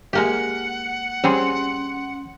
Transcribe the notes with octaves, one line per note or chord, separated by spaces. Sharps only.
G#3 A#3 G4 F#5
G3 C4 C#4 G#4 C6